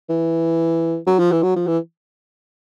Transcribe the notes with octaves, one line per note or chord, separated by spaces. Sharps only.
E3
F#3
F3
E3
F#3
F3
E3